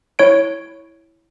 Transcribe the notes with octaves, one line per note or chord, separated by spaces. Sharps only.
E4 C#5 D7